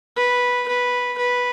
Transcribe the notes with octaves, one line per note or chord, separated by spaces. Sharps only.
B4
B4
B4